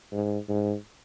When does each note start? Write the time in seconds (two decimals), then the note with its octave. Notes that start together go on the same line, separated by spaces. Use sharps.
0.12 G#2
0.49 G#2